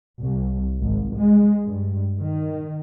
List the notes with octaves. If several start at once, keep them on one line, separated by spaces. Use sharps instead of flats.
C2
G#1
G#3
G2
D#3